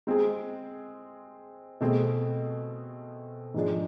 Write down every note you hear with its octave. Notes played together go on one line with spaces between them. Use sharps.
G#3 C4 G#4
B2 A3 C4 G#4
G#2 F3 G#3 D4